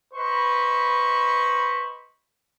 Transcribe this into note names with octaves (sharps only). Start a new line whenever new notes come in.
B4 C5 D#5 B5 C#6